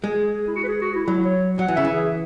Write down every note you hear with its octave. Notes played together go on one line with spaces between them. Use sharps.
G#3 G#4
E4
F#4
B4
G#4
F#4
E4
F#3 E4
C#5
F#3 F#5
E3
C#3 E5
E3
G#4